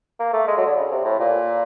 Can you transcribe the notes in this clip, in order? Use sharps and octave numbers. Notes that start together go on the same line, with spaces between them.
A#3
A3
G#3
F#3
D3
C#3
C3
A2
A#2